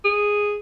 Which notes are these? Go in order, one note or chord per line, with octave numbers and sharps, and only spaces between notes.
G#4